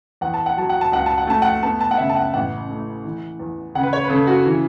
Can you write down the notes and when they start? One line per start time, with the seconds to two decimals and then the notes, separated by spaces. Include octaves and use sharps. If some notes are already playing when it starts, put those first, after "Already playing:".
0.21 E2 F#5
0.34 A5
0.46 F#5
0.57 F#3 A5
0.70 F#5
0.81 A5
0.92 C#2 F#5
1.06 A5
1.18 F#5
1.27 A3 A5
1.42 F#5
1.63 B3 A5
1.81 A5
1.91 F#5
1.98 C#3 E5
2.09 A5
2.16 F#5
2.34 A1 F#5
2.69 A3
3.05 E3
3.40 E2
3.75 C#3 F#5
3.83 B4
3.93 C#5
4.04 B4
4.10 C#3 A4
4.27 F#4
4.46 E3